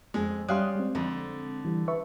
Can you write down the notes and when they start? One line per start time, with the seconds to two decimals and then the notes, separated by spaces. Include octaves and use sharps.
0.14 F2 G#3
0.48 G3 C#4 F5 C6 D#6 F#6
0.76 G#3 C4
0.95 F2 D3
1.65 E3 G3
1.88 B4 E5 C#6